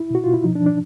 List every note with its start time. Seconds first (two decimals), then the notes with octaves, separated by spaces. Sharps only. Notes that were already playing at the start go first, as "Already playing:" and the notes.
Already playing: E4
0.10 B2 F#4
0.24 B2 F4
0.34 E4
0.44 F3 D#4
0.55 D4
0.61 F3
0.66 D4